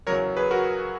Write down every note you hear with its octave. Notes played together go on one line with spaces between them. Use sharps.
E2 C#3 F#3 A#4 C#5
G#4 B4
F#4 A#4